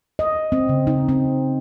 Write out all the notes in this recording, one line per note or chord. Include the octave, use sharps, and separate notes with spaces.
D#5
C4
C#3
D#4
C4